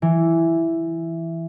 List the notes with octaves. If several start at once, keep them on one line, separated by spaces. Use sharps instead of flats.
E3